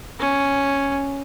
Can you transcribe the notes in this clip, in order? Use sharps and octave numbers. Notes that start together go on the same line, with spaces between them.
C#4